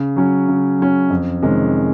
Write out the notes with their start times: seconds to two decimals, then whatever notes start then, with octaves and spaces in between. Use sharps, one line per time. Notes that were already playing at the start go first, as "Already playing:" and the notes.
Already playing: C#3
0.16 F#3 C#4
0.48 C#3
0.79 F#3 C#4
1.10 F2
1.42 C3 D#3 G#3 C#4